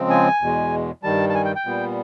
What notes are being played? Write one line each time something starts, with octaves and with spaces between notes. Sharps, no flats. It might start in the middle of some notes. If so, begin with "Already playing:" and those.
Already playing: C#3 F3 G#3 C4
G#5
E2 B2 G#3
G2 D#3 G3 A5
A5
G#5
G5
G5
A#2 G3 B3